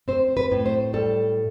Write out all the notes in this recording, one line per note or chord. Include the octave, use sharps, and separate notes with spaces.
C4 C5
B4
A2
C5
G3 A4